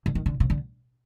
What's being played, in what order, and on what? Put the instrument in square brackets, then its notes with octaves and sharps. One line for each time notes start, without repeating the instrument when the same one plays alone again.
[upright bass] D3
D#3
D3
C#3
D3